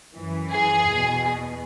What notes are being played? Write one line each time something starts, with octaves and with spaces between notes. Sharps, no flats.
F#2 E3
G#4
E2 B2